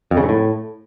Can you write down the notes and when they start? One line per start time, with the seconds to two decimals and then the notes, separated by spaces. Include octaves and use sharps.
0.11 F2
0.17 C#3
0.23 G#2
0.29 A2